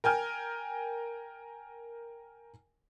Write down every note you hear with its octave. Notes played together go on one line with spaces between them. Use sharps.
A#4 G5 G#5 F6